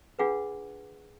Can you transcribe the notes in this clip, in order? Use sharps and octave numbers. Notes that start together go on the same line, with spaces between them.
D4 F4 G#4 B4 F#5